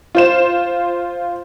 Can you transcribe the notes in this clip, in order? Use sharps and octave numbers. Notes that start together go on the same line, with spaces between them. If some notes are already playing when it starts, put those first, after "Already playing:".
F4 C5 E7